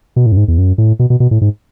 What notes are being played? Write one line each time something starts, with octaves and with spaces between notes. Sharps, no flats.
B2
A2
F#2
G#2
E2
F#2
A2
B2
B2
B2
A2
G#2